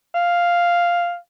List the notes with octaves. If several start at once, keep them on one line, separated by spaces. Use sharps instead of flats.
F5